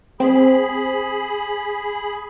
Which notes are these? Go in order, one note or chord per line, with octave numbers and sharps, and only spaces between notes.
C4 G#4 B5